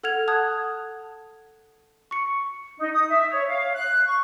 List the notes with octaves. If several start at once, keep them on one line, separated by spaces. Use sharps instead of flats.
A4 F#5 F6 G#6 F7
F#5 A5 D#6 F#6 G#6
C#6 C#7
D#4
D#6
E5
C#5
F5
F#6
C#6